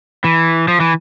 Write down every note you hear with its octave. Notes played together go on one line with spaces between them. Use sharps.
E3
F3
E3